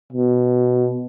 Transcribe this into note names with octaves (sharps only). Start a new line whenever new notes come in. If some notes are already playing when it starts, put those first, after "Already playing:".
B2